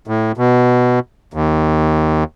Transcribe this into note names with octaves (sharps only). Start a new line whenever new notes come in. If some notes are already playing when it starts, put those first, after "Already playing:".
A2
B2
D#2